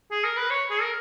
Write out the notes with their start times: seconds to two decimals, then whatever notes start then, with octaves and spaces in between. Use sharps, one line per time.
0.11 G#4
0.24 A#4
0.37 B4
0.51 C#5
0.71 G#4
0.81 A#4